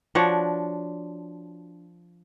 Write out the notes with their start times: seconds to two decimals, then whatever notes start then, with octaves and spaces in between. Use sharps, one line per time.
0.15 F3 D4 F#4 C#5